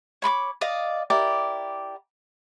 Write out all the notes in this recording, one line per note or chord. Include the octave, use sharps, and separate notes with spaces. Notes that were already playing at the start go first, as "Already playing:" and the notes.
C#5 B5 C6 D6
D5 D#5 F5
E4 G4 A#4 D5